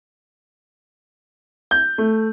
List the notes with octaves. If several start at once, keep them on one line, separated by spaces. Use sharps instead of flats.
G6
A3